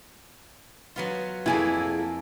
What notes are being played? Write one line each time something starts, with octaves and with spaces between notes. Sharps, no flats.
F#3 B3 F4
F2 A3 A#3 E4 G#4